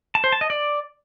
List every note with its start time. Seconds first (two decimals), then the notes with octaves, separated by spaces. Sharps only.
0.15 A5
0.24 C5
0.32 A5
0.41 D#5
0.50 D5